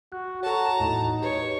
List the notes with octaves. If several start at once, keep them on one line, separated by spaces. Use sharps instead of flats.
F#4 F#6
F#4 A4 C#5 A5 A#5
E2 A2 D#4
G4 B4 C#5